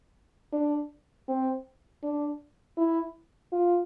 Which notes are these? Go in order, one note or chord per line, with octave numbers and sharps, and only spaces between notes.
D4
C4
D4
E4
F4